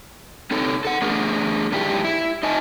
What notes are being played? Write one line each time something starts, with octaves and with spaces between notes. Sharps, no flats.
C4 D#4 A4 C#5
A4 F#5
A3 D4 G#4 A#4
G#2 D#3 D4 E4 G4
E4
D#4 D#5 G#5 A5